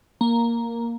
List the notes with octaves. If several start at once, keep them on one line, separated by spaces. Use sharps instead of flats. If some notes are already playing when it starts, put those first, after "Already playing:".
A#3